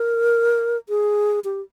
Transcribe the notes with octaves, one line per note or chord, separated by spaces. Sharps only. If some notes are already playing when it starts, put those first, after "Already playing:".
Already playing: A#4
G#4
G4